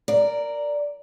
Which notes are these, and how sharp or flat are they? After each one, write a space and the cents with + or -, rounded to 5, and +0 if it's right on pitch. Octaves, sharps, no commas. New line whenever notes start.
A#4 -5 D5 +0